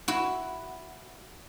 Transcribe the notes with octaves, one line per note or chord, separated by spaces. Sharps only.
E4 F#4